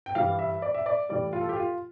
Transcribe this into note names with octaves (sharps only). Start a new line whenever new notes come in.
G5
G2 E3 G3 F5
E5
D5
E5
D5
A2 E3 G3 D5
F4
A4
G4
F4